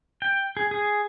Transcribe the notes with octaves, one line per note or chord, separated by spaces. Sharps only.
G5
G#4
G#4